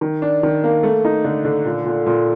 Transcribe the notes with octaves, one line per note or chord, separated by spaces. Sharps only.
D#3
D4
D#3
A#3
A3
D#4
D3
D3
A#2
A#2
A#2